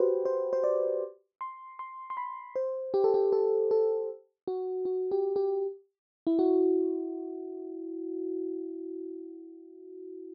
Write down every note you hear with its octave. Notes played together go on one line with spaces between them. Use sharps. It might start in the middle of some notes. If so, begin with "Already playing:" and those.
Already playing: F#4 G4 B4 C5
C5
C5
D5
C6
C6
C6
B5
C5
G4
A4
G4
A4
A4
F#4
F#4
G4
G4
E4
F#4